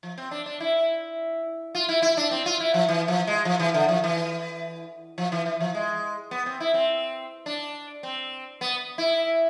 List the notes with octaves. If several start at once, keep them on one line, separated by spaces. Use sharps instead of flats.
F3
C4
D4
D4
E4
F4
E4
E4
D4
C4
F4
E4
F3
E3
F3
G#3
F3
E3
D3
F3
E3
F3
E3
E3
F3
G#3
B3
C4
E4
C4
D4
C4
B3
E4